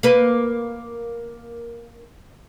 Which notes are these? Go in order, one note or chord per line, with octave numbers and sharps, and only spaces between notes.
A#3 B4